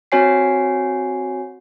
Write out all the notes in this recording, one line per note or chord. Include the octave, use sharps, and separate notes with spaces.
C4 F#4 C#5 G#5 C7